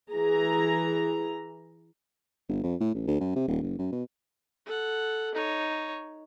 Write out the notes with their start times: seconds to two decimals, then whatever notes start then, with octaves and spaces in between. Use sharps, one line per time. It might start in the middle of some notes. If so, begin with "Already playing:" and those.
0.11 E3 G#4 A#5
2.49 G1
2.63 F2
2.80 A2
2.95 A1
3.07 D2
3.20 F#2
3.35 C3
3.48 D#1
3.62 F#1
3.78 F#2
3.92 B2
4.65 A4 F#5
5.35 D#4 C#5